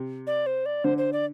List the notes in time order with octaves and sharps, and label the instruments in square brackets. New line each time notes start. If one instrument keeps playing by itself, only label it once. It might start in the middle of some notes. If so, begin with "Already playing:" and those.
Already playing: [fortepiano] C3
[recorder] D5
C5
D5
[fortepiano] D3 [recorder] C5
[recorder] C5
D5